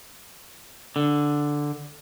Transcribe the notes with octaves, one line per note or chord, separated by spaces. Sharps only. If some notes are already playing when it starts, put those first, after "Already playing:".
D3